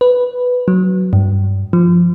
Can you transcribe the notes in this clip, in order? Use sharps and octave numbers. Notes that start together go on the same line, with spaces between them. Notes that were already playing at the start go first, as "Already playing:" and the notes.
B4
F#3
G2
F3